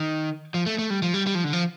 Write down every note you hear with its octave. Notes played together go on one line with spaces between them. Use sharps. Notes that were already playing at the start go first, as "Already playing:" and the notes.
Already playing: D#3
F3
A3
A3
G3
F3
G3
G3
F3
D3
F3